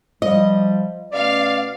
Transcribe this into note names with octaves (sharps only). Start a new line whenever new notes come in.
F3 G3 D#5
B2 A3 C#4 D5 F5